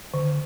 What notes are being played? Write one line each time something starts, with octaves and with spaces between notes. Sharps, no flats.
D3